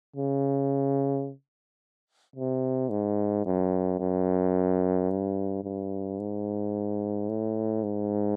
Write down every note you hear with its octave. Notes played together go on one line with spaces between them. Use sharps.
C#3
C3
G#2
F#2
F#2
G2
G2
G#2
A2
G#2